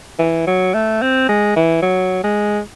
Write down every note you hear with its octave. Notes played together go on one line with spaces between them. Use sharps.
E3
F#3
A3
C4
G#3
E3
F#3
G#3